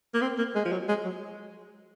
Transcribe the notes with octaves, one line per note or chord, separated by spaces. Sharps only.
A#3
C4
A#3
G#3
F3
F#3
G#3
F#3